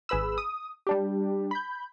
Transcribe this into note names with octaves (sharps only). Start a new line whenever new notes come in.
G#1 G#4 B4 B5 E6
D#6
G3 D4 G4
B5 G6